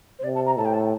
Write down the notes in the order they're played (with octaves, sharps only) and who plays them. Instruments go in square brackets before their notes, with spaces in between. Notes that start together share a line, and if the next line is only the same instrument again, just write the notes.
[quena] C5
[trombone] C3 [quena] D5
[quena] A5
A#5
[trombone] A2 [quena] A5
[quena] G5
A5